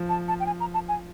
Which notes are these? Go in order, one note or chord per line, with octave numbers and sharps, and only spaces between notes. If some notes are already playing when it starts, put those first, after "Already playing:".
Already playing: F3
A5
A5
G5
G#5
A#5
A5
G#5